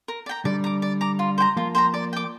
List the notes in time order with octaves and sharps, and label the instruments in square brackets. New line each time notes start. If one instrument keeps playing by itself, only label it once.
[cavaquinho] A#4
D5
G5 A#5
[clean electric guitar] D3 G3 [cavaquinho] D5
[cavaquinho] A#5 D6
D5
A#5 D6
F4
C5 G5 A#5
[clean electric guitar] F3 A#3 [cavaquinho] F4
[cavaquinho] C5 G5 A#5
D5
G5 D6